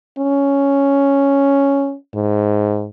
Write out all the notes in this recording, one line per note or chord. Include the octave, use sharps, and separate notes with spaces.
C#4
G#2